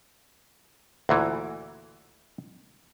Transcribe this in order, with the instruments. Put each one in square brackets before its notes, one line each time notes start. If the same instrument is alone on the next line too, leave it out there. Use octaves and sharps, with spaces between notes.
[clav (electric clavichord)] D2 A#2 E3